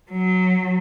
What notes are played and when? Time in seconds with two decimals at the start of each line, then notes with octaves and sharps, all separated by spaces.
0.11 F#3